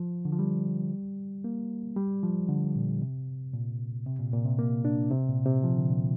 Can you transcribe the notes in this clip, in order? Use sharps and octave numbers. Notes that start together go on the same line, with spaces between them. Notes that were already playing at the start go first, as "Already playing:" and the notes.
Already playing: F3
D3
F3
G3
A#3
G3
F3
D3
A#2
C3
A#2
C3
A#2
A#2
C3
A#3
D4
C3
A#2
C3
F3
D3
A#2